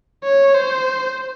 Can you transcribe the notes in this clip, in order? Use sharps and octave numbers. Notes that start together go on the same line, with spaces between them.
C#5
C5